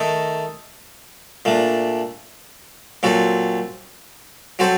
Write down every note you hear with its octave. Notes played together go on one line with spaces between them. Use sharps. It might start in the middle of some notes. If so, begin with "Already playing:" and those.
Already playing: D#3 A3 D#4 A4
A#2 A3 D4
A#2 F#3 C4 F#4 A4
F#3 C4 F#4 A4 C5